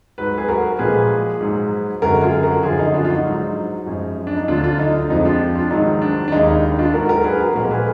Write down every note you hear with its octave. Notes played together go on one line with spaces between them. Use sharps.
G#2 F#3 B4
G#4 B4
F#4 A#4
A#2 F3 G#3 G#4 B4
G#2 F#3
F#2 D3 G#3 F#4 A#4
F4 G#4
F#4 A#4
F#2 D3 F3 F4 G#4
D#4 F#4
D4 F4
F4
D#4 F#4
G#2 F#3
F#2 F3 G#3
D4
D#4
D2 D3 F#3 D4 F4
D4 F4
D#4
F2 F3 G#3 D#4
D4 F4
D4 F4
G#2 D#3 F#3 D#4
D4
D4
D#2 D#3 G#3 D#4
D#4
D#4
D4 F4
G#2 F#3 F#4 A#4
F#4 A#4
G#4 B4
F#4 A#4
A#2 F3 G#3 F#4 A#4
G#4 B4